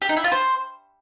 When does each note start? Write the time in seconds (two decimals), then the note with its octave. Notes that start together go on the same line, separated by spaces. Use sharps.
0.02 G4
0.09 D#4
0.17 E4
0.24 F4
0.32 C5